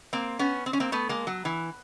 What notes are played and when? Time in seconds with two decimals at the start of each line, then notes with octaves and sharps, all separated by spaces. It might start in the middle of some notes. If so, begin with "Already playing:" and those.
0.13 A#3 C4
0.39 B3 C#4
0.66 C4
0.73 C#4
0.80 A#3 C4
0.92 A3 B3
1.09 G#3 A#3
1.27 F#3
1.45 E3